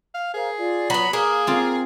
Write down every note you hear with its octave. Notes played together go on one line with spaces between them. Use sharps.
F5
G#4 A#4 C5 F5
F4 D5
F#3 B3 B5
A#3 G#4 D#6
C4 F4